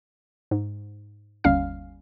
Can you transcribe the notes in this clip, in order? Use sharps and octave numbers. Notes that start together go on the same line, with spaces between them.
G#2
G1 D#2 G3 C#4 F5 F6